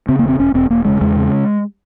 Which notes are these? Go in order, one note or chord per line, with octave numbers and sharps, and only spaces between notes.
C#3 C4
E1 A#3
C4
E1 C#4
E1 C4
E1 A#3
C#3 G#3
E2 G#3
C#3